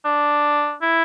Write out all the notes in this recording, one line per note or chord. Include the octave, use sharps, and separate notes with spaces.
D4
E4